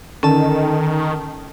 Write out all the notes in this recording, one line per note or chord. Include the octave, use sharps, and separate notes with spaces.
D3 D#3 C#4 A4 A5